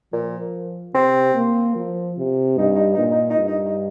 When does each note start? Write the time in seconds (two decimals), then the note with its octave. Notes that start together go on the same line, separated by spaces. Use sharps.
0.13 A#2 F3
0.94 C3 C4
1.35 A#3
1.76 F3
2.18 C3
2.58 G2 D#4
2.76 D#4
2.94 D#4
2.98 A#2
3.11 D#4
3.30 D#4
3.39 G2
3.48 D#4
3.66 D#4